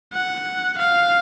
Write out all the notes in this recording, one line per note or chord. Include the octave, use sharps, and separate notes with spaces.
F#5
F5